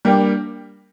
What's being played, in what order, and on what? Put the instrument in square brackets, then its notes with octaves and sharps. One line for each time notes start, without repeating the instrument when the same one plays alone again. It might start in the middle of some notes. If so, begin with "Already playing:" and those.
[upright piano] G3 A#3 D4 G4